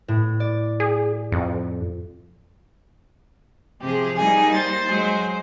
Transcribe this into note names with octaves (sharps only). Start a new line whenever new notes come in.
A2
D5
G#4
F2
C3 F3 G4 G#4
G3 A#3 D#4 G#4 G#5
C5 A6
F#3 G#3 G#4